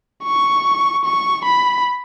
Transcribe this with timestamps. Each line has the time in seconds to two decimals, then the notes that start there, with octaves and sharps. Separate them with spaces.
0.23 C#6
1.05 C#6
1.45 B5